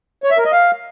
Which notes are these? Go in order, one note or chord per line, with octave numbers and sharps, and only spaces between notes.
C#5
E5
A#4
D#5
F5